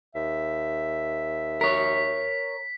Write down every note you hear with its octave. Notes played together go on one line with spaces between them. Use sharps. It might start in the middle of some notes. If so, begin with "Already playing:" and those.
D#2 E5
A#4 C#5 B6